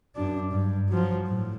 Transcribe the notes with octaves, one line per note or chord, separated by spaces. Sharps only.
F#2 D4
G2
F3 F#3
A2